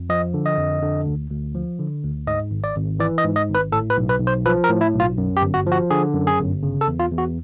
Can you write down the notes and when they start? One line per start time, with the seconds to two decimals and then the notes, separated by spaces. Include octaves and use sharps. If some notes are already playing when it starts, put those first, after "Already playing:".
Already playing: F2
0.09 F3 D#5
0.34 D3
0.46 D#5
0.58 F2
0.82 D3
1.06 D2
1.30 D2
1.55 F3
1.79 D3
2.03 D2
2.27 G#2 D#5
2.51 G#1
2.64 D5
2.76 G#1
2.99 E3 D5
3.18 D#5
3.24 G#2
3.36 D#5
3.48 G#1
3.55 B4
3.72 A2 A4
3.90 B4
3.97 B1
4.09 B4
4.20 B1
4.27 C5
4.46 F3 B4
4.64 A#4
4.69 A2
4.81 E4
4.94 B1
5.00 F4
5.18 F#2
5.37 G4
5.41 G1
5.54 F#4
5.67 F3 F#4
5.91 D3 G#4
6.14 F#2
6.27 G#4
6.38 G1
6.63 C#3
6.81 A4
6.87 E2
6.99 F4
7.12 E2
7.18 F#4